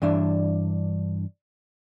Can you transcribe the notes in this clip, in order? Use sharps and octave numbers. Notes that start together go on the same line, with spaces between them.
G2 E3 D4 E5